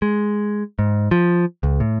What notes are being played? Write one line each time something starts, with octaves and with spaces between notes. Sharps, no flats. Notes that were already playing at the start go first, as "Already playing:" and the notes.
G#3
G#2
F3
C#2
A2